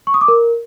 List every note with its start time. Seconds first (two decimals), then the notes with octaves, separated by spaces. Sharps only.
0.07 C#6
0.14 D#6
0.21 D6
0.28 A#4